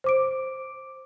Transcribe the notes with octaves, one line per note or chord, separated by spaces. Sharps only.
C5 D6 D7